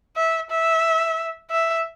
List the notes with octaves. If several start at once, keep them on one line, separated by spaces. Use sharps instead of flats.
E5
E5
E5